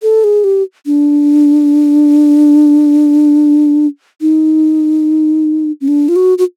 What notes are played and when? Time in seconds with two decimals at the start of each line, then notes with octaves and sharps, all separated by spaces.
0.03 A4
0.24 G#4
0.44 G4
0.86 D4
4.21 D#4
5.81 C#4
5.88 D4
6.09 F4
6.16 F#4
6.38 F#4